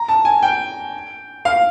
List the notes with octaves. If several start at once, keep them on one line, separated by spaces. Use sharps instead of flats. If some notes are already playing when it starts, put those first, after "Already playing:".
Already playing: A#5
A5
G#5
G5
F5